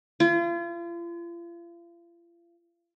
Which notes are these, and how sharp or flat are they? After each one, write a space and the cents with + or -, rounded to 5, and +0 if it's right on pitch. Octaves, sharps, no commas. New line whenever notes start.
F4 -40